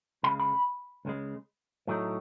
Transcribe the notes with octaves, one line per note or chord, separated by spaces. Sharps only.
C#2 C#3 G#3 B5
B5
C#2 C#3 G#3
A2 F#3 A3 D#4